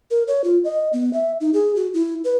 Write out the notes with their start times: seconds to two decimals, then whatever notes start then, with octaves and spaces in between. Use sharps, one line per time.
0.11 A#4
0.28 C#5
0.44 F4
0.64 D#5
0.93 B3
1.13 E5
1.40 D#4
1.54 G#4
1.76 F#4
1.94 E4
2.24 B4